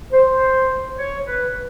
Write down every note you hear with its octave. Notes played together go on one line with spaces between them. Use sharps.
C5
C#5
B4